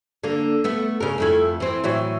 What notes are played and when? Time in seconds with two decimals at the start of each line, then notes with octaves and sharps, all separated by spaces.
0.24 D3 A#3
0.64 A3 B3
1.00 C#3 A#4
1.18 F2 A3 E4
1.60 E3 C4
1.84 A2 E3 F#3